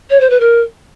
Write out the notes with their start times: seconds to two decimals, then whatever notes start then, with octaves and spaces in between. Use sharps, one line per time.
0.10 C#5
0.20 C5
0.30 B4
0.40 A#4